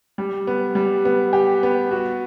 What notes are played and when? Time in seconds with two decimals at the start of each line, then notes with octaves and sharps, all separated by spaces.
0.18 G3
0.47 B3
0.75 G3
1.05 B3
1.33 G4
1.63 B3
1.91 F#4